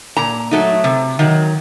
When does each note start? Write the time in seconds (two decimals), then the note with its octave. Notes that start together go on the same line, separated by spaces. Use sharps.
0.17 A#2 A#5
0.51 F#3 A3 D#4
0.84 C3
1.19 D#3 F#3